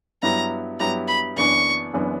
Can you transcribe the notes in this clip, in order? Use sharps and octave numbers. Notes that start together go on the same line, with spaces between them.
G2 F#3 B3 E4 G4 A#5
G2 F#3 B3 E4 G4 A#5
B5
F#1 F#2 E3 B3 D4 C#6
F#1 F#2 E3 B3 D4